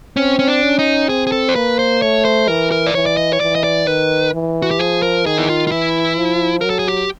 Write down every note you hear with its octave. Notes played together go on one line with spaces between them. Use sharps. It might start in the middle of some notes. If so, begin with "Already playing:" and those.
C4 C#4
C#4
D4
C#4
D#4
C4 G#4
G#4
A4
C5
A#3 B4
C5
A3 C#5
C5
E3 A#4
A#4
D5
E3 C#5
D5
D#5
C#5
E3 D5
D#5
D5
D#3 B4
E3
F#4
G4
F3 G#4
A#4
D#3 G#4
E4
F4
F4
E3 E4
F3
F#3 A#4
A4
G#4
G4